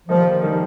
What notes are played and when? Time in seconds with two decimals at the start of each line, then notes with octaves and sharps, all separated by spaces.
0.08 D#3 F3 G3 A#3 D#4
0.41 D#3 G3 A#3 D#4